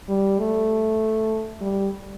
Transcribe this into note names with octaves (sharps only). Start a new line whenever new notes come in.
G3
A3
G3